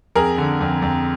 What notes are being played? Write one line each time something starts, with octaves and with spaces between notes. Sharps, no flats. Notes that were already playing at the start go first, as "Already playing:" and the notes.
F2 G#4 A#4
D3
F2
F2